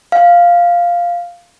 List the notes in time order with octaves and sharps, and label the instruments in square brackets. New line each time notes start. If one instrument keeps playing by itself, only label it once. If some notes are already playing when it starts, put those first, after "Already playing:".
[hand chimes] F5